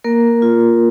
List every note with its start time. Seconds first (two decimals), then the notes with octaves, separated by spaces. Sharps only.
0.04 A#3 A#4
0.42 F4